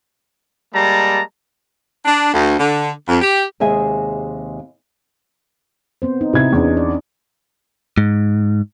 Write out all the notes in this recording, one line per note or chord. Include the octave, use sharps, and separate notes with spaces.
G3 G#3 A#3 A5 A#5
D4
D2
D3
F2
G4
D#2 C3 G#3 G#4 E5 G#5
B3 C4 C5
D#4
C3 C4 D#4 E4 G#6
E2 C#4 D4
D5
G#2